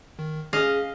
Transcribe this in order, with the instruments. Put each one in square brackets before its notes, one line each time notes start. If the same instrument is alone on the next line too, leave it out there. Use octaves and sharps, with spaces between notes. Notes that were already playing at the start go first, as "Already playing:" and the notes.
[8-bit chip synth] D#3
[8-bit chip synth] C#4 [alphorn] G#4 [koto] D#5 F5